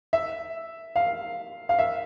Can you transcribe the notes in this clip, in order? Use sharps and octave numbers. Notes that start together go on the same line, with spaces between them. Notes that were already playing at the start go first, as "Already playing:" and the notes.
E5
F5
F5
E5